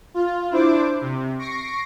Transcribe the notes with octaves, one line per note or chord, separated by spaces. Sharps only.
F4
D4 E4 C5 D6
C3
C#6 A#6 C7 D7